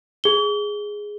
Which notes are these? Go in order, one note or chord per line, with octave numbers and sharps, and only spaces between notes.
G#4 G7